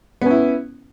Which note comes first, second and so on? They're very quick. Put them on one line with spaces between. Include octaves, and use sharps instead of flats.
B3 C#4 E4